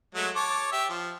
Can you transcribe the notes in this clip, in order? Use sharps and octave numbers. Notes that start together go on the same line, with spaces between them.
F#3 G#3 A3
C#5 A5 D6
G4 E5
F3